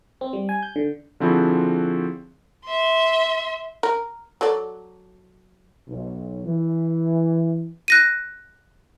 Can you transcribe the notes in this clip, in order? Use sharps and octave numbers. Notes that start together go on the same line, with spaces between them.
C4
G3
G#5
G6
D3
D3 F3 C4 E4 F#4 G#4
E5 C6
A#4
F#3 A4 D5
B1
E3
F#6 A#6 D#7